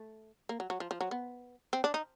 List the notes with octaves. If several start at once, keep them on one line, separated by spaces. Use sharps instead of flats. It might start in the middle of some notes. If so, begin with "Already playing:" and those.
Already playing: A3
A#3
F#3
F#3
F3
F3
F#3
B3
C4
D4
D#4